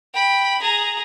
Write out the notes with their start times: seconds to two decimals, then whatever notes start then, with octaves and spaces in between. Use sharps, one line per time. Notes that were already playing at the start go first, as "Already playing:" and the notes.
0.14 G5 B5
0.61 G#4 A#5